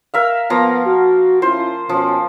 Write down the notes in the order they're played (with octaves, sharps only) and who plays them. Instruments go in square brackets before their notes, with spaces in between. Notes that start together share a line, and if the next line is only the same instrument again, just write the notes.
[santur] A#4 E5 F5
[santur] F3 A#3 A#5 [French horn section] B3
[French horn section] F#4
[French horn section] C#4 E4 F4 [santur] C5
[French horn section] B2 C#4 [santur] F3